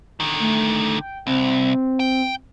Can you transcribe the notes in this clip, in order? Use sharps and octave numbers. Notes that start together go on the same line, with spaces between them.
D3 D#3
A3
G5
C2 C4
G5